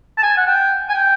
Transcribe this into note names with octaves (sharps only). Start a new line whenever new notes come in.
A5
G#5
F#5
G5
G#5
G5